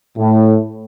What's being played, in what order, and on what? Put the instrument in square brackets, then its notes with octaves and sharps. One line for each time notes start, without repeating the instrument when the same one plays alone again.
[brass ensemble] A2